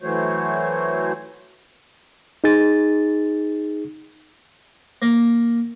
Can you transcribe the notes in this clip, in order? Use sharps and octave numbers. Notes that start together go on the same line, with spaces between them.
E3 F#3 A3 F#4 C5 C#5
D#4 G#4 A6
A#3